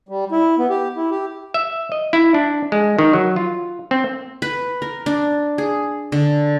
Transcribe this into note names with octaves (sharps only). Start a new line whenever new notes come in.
G3
E4
B3
G4
E4
G4
E5
D#5
E4
D4
G#3
D#3
F#3
F4
C4
B4
A#4
D4
G#4
D3